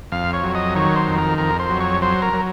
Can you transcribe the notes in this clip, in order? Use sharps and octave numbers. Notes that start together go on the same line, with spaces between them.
F2 F5
C#5
F#3
D#5
D#3 C#5
C5
F2
A#4
F2 A#4
C5
F#3
C#5
F#3 C5
A#4
F#3